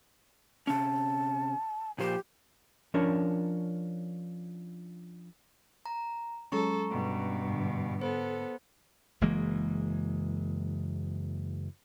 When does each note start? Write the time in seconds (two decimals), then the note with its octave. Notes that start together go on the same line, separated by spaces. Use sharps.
0.67 C3 C#4 A5
1.98 A#2 F3 G4 C5
2.94 F3 C#4 D4 A#4 C#5
5.86 A#5
6.52 F#3 G#3 C#4 A4 A#5 C#6
6.90 G2 B2
7.50 G#2 D3
8.01 B3 A4 C5
9.21 F#1 E3 G#3 A#3